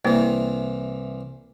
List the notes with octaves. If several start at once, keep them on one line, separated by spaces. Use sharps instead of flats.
C2 E3 A#3 E4 C5